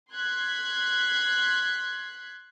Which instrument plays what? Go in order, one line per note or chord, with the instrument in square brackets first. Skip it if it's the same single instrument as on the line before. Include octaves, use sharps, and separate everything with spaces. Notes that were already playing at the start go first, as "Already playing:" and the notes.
[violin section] C6 F#6 G#6 B6